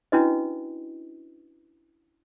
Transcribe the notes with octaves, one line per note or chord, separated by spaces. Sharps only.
C#4 D4 E4 F#4 B4 D#5